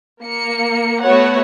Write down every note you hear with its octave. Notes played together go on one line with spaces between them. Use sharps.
A#3 C#7
A3 B3 F#4 C#5 F#5